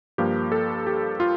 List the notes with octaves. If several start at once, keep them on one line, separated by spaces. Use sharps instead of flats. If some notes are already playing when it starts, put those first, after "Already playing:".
G2 F3 A#3 G4
A4
G4
F4